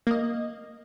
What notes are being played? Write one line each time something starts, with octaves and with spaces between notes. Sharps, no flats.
A#3 D#5